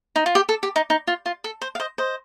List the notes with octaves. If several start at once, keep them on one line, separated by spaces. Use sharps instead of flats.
D#4
F4
G4
A4
G4
D#4
D#4
F4
F4
A4
C5
F5
C5 D#5
C5 D#5